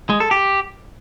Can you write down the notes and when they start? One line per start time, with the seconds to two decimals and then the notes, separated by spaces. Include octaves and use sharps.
0.10 G#3
0.20 A4
0.31 G4